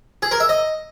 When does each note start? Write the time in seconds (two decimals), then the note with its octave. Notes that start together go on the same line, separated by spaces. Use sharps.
0.22 G#4
0.31 A#4
0.40 E5
0.49 D#5